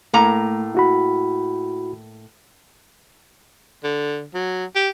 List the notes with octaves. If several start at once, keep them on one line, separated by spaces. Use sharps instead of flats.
A2 A3 A#3 A#5
E4 F#4 B5
D3
F#3
G4